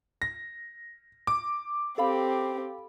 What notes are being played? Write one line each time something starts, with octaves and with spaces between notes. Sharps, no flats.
A#6
D6
C4 G4 A4 F5 B5